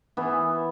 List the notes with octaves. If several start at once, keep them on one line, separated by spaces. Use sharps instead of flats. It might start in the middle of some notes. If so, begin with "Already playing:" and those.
E3 B3 E4